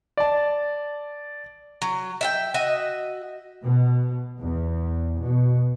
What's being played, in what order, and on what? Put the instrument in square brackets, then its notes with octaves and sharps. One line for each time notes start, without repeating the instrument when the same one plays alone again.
[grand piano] D5 A5
[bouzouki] F#3
E5 F#5 G5
F#4 D#5 E5
[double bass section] B2
E2
B2